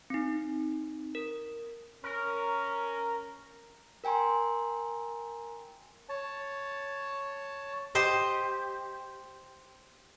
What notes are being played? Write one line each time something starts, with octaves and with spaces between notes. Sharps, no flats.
C4 D#4
A#4
C#4 A#4
A#4 G5 G#5 A#5 C6
C#5 A5
G4 C5 D#5